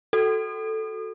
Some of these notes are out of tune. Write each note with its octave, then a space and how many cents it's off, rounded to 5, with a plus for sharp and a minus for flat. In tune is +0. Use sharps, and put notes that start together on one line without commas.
F#4 +0 A4 +0